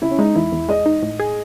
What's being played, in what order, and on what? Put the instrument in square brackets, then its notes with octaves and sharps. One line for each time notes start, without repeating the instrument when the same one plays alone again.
[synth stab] C#3 [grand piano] E4
[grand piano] C#4
[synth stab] G#3 [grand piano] D#4
[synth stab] E2 [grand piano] E4
[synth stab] E2
[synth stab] G#3 [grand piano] D#5
[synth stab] D#4
A2
G#4